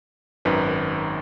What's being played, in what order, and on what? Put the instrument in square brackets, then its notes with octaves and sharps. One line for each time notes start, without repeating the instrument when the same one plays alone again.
[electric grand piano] G#1 F#2 D#3 B4